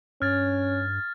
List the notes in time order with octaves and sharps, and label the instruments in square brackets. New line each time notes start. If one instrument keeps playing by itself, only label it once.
[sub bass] G2 [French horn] C#4 [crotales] F6 G#6 A6